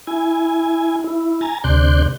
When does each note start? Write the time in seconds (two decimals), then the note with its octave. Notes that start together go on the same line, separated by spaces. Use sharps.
0.07 E4 G#5
1.04 E4
1.41 G#5 A#5 A6
1.64 D2 C3 D5 C6 F#6 G6